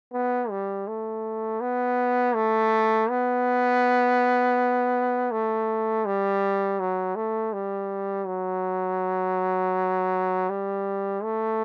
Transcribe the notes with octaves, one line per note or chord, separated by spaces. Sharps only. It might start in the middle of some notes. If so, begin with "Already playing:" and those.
B3
G3
A3
B3
A3
B3
A3
G3
F#3
A3
G3
F#3
G3
A3